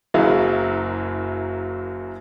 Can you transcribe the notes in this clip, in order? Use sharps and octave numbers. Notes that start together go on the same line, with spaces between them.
F#1 F#2 F#3 E4 G#4 F5